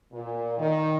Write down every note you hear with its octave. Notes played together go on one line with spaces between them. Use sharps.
A#2
D#3